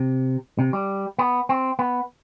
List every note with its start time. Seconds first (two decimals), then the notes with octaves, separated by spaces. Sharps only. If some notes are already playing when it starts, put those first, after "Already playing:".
Already playing: C3
0.59 C3
0.73 G3
1.19 B3
1.49 C4
1.79 B3